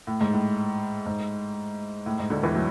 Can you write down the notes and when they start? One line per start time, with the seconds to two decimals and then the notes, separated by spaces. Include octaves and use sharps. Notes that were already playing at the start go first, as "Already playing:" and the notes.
0.07 A2
0.21 G#2
0.33 A2
1.06 G#2
2.06 A2
2.19 G#2
2.30 D2 D3
2.43 E2 E3
2.55 F#3